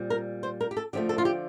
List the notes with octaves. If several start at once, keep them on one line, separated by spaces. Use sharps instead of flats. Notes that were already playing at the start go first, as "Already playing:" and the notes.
Already playing: A#2 G3 C4
A#4
C5
A#4
G4
A4
D3 F3 A3 G4
A4
F4
G4